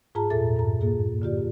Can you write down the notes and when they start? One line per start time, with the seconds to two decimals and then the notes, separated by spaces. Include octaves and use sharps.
0.15 G#2 F4 G#4 A5 A#5
0.30 E2 A#2 A4 E5 A6
0.56 G2 A#5
0.81 A#3 F4 G#4
1.22 D3 F4 G4 D5